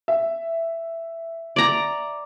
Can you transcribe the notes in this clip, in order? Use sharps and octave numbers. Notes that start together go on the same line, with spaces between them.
E5
D5 A#5